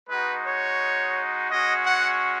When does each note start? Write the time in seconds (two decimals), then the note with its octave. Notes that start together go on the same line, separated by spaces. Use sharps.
0.10 G#3 D#4 F#4 B4
0.45 C#5
1.49 G#3 C#4 F#4 D#5
1.84 F#5